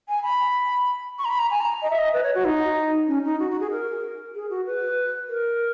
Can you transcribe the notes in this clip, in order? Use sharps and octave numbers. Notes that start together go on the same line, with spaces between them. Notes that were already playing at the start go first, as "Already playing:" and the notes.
G#5
B5
C#6
A#5
B5
A#5
G#5
A#5
D#5
E5
D#5
B4
C#5
F#4
D#4
C#4
D#4
F#4
F#4
G#4
A#4
G#4
F#4
B4
A#4